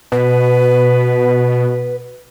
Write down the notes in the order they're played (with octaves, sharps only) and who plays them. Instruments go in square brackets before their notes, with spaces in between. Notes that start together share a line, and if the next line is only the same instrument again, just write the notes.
[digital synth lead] B2 [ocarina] B4